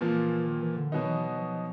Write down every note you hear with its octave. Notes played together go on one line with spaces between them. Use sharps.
A#2 E3 F3 A#3
D#3
E3
D3
B2 D#3 F#3 B3 D#4
E3
F3